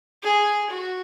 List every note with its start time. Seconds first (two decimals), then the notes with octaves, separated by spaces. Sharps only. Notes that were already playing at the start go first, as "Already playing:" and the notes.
0.23 G#4
0.70 F#4